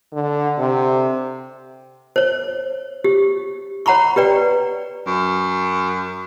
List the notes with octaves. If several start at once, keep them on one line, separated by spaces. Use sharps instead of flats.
D3
C3
C5 C#5
G4
C#5 F#5 A#5 B5 C#6
G4 B4 D5 G5
F#2